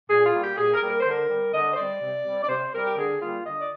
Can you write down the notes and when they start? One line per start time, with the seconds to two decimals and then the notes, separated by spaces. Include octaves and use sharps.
0.10 A#2 G#4
0.26 F4
0.34 G3 A#3
0.42 G4
0.57 A#2 G#4
0.74 A#4
0.81 G3 A#3
0.89 A#4
1.00 C5
1.05 D3
1.11 A#4
1.30 G3 C4
1.53 D3 D#5
1.74 C5
1.77 G3 C4 D5
2.01 C3
2.26 G3 C4
2.43 D5
2.49 C3 C5
2.73 G3 C4 A#4
2.86 G4
2.96 D3 G#4
3.20 G3 A#3 F4
3.45 D3 D#5
3.57 D5